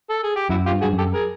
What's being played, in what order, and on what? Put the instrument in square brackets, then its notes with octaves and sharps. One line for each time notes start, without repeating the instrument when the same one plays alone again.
[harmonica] A4
G#4
G4
[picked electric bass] F#2 [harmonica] E4 F#4
[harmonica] F4 G4
[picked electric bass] G2
[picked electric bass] G2 [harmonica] F#4 G#4
[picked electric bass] F#2
[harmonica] G4 A4
G#4 A#4